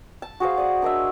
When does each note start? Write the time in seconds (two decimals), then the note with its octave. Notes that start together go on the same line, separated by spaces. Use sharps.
0.22 A5
0.40 F#4 G#4 C5 F5
0.58 D5 F#5 D#6
0.82 D4 A#4 D#5 E5